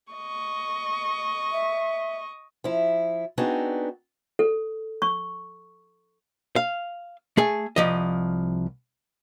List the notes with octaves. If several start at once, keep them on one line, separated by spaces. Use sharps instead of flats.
D#5 C#6
E5
F3 E4
B3 C4 D4 D#4 F#4 G#4
A4
C#6
F5
A3 G#4
C2 F3 D#5